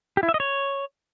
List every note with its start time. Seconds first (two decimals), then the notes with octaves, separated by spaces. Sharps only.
0.17 G4
0.23 E4
0.29 E5
0.34 D#5
0.40 C#5